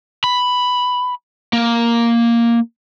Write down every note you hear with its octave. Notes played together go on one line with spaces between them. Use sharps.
B5
A#3